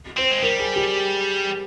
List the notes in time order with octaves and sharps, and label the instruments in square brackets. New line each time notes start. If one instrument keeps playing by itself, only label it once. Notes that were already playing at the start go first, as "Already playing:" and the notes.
[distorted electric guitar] C4 [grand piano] C5
[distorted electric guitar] G#3
[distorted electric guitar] G3 [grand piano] A#4
[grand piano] G#4
G4